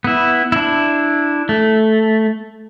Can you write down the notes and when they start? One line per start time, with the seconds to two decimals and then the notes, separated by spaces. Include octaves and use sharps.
0.04 B3 E4
0.52 D4 E4
1.49 A3